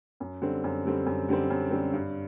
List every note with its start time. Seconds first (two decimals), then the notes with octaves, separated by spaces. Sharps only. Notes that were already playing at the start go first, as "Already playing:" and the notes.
0.20 F#2
0.42 D3 G3 C4
0.64 F#2
0.86 D3 G3 C4
1.06 F#2
1.29 D3 G3 C4
1.50 F#2
1.71 D3 G3 C4
1.93 G2